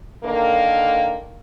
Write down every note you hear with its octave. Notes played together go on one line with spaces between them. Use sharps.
D3 D#3 A#3